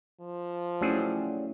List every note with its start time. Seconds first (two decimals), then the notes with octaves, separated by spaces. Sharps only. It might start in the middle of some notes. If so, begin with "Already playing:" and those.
0.21 F3
0.81 F#3 G3 A3 C#4 E4 G#4